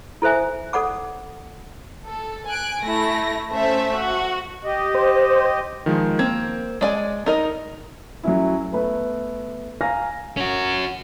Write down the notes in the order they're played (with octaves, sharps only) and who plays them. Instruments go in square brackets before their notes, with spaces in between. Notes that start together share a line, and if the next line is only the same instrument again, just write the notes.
[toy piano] E4 A4 C5 E5 G#5
A4 D5 F#5 D6
[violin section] A4
G#5 F#6 D7
A3 E4 A#6
A3 C#4 C5 E5
F#4
[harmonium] G4 D#5
[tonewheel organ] C5
[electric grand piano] D#3 F3 G#3
[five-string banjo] A#3 C4 [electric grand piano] G#6
[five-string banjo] G#3 D5 G#5
D#4 A#4 D#5
[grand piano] F#3 A3 C#4 E4
A3 B3 B4
F5 G#5 A#5 F6 A#6
[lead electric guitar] C#4 F#4